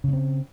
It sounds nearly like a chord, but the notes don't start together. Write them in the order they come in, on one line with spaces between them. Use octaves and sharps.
C#3 C#4 C4